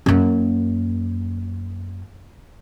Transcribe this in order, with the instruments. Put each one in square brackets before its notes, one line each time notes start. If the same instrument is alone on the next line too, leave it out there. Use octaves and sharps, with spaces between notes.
[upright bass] F#2 A#3